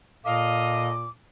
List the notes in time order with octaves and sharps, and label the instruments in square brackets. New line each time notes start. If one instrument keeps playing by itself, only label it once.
[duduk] A#2 [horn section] A4 D#5 [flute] F5 [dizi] D6